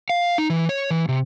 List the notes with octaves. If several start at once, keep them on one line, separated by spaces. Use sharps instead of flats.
F5
D#4
E3
C#5
E3
C3